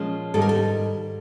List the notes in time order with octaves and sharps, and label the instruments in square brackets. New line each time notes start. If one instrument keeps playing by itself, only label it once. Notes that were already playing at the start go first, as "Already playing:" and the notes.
Already playing: [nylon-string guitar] A#2 F3 G#3 C#4
G#2 D#3 G3 A4
A#4
A4